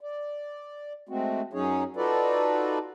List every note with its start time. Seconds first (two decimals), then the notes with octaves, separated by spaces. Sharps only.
0.01 D5
1.09 G#3 A3 C4 F#4
1.53 F#2 F#3 C#4 D#4 G#4 C#5
1.96 D#4 F4 F#4 A4 B4 D5